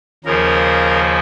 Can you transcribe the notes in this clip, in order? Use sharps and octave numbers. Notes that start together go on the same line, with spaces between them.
D#2 C#3 F3 A#4